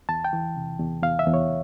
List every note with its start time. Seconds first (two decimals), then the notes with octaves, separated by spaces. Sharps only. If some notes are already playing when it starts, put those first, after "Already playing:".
0.09 E2 A5
0.25 G5
0.33 E3
0.56 C3
0.80 E2
1.03 E2 F5
1.19 E5
1.27 E2
1.34 C#5